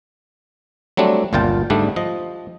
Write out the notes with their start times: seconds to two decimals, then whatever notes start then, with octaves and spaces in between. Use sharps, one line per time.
0.97 F#3 G3 A3 C4 D4
1.33 G1 C#2 A#2 F4 G5 A5
1.70 G#2 D3 G3 A3 D4
1.96 F3 D#5